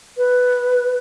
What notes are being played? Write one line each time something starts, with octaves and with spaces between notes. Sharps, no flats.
B4